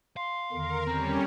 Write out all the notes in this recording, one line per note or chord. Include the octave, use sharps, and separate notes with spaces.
F5 C6
E2 D3 D#3 A#4
G3 C4 C#4 A#5